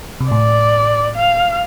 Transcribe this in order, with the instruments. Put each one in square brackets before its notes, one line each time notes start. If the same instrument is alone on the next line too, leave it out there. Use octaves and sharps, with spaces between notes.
[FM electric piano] C3
[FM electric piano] A2 [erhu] D5
[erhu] F5